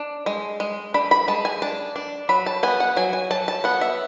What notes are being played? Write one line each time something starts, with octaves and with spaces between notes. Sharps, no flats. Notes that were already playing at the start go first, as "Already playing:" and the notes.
Already playing: D4
G#3
G#3
D4 B5
B5
G#3 A5
G#5
D4 A5
D4
F#3 B5
A5
B3 G#5
F#5
F#3 G#5
G#5
F#3 A5
A5
B3 F#5
E5